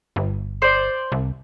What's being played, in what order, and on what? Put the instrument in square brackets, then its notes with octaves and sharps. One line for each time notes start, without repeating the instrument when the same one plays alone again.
[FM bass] G1
[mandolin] C5 D5
[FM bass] C2